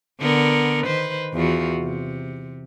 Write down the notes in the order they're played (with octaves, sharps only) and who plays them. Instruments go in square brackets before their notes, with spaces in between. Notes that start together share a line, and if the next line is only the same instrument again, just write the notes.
[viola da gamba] D3 B3 A#4
D#3 B4 C5
E2 F4 F#4
C3